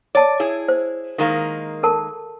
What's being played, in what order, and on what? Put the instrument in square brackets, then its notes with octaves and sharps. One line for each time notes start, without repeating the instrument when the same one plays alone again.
[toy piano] C#5 A5 [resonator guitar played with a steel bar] D5
[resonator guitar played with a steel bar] E4 G#4
[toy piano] C5
[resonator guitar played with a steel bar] D#3 G#3 A#3
[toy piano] A4 A#4 A5